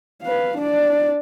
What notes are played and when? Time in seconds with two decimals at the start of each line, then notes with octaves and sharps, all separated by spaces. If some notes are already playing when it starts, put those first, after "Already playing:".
0.22 B4 F5
0.58 D4 D5